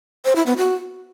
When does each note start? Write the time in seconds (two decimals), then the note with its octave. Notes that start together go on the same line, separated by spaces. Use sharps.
0.25 C5
0.36 E4
0.46 B3
0.57 F#4